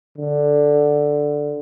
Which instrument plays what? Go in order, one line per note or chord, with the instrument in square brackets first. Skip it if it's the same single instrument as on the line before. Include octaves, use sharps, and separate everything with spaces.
[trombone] D3